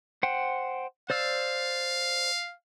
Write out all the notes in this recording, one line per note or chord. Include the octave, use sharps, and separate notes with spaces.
C5 F#5 G5
C5 D5 F5 E6